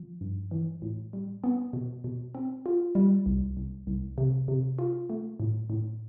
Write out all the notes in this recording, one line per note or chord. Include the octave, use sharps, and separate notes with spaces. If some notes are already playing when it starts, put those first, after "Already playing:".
Already playing: F3
G2
E3
A2
G3
B3
B2
B2
C4
F4
G3
C2
C2
C2
C3
C3
F4
A3
A2
A2